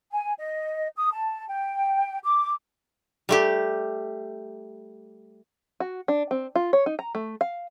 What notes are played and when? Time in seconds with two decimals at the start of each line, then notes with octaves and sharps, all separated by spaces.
0.12 G#5
0.38 D#5
0.95 D#6
1.11 A5
1.48 G5
2.23 D6
3.29 G3 A3 G4
5.80 F#4
6.08 D4
6.31 C4
6.55 F4
6.73 C#5
6.86 D#4
6.99 A#5
7.15 A3
7.41 F5